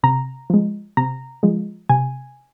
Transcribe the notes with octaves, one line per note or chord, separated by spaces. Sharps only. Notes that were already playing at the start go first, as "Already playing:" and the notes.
C3 A#5
F3 G#3
C3 A#5
F3 G#3
C3 G#5